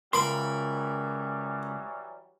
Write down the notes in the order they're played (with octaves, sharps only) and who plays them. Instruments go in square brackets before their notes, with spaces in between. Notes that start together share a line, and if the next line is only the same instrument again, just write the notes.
[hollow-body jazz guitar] C#2 C6 [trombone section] E3 F#3 G3 [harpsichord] A#4 B5